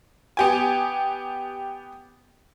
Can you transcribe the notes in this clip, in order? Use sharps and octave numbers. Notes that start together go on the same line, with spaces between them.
B3 G4 G#5